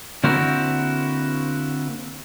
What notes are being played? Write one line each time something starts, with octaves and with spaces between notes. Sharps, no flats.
D3 A#3 C4 E4 F#4 A#4